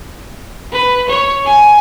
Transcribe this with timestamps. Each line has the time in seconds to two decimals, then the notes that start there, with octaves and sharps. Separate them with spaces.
0.72 B4
1.08 C#5
1.45 G#5